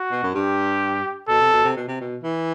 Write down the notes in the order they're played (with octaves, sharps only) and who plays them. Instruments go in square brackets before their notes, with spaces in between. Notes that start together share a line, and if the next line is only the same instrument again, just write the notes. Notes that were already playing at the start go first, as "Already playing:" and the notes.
Already playing: [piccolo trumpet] F#4
[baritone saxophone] B2
F#2
[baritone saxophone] G2 [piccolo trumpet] G4
[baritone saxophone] B2 [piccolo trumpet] A4
[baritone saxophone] C3
B2
C3
B2
C3
B2
E3